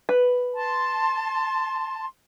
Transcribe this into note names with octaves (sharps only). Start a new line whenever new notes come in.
B4
A5 C6